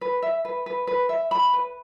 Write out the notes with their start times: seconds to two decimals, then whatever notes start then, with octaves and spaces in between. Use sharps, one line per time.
0.01 B4
0.22 E5
0.45 B4
0.66 B4
0.87 B4
1.09 E5
1.31 B5
1.53 B4